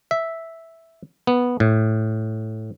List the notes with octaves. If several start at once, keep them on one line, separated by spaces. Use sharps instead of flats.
E5
B3
A2